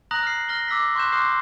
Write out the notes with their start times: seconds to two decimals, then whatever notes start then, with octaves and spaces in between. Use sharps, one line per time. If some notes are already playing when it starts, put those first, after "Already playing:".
0.11 A#5 D#6 F#6 A#6 F#7
0.23 F6 C7
0.49 F6 A#6 G7
0.68 D6 E6 A#6 B6
0.95 C6 C#6 F#6 G6 E7
1.12 C6 D6 D#6 F6 F#6 C7